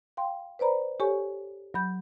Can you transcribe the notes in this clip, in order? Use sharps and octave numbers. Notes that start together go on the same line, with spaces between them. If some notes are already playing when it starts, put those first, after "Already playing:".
F5 G5 C6
B4 C5 D5 A#5 B5
G4 A4 C#5 G#5 C#6
F#3 B5 G6